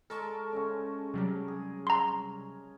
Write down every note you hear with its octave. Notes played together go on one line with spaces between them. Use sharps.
G#3 A4 A#4 A5 C#6
C#3 G#3 C#4
C3 F#3 G3 A#4 A5
G#4
A#5 C6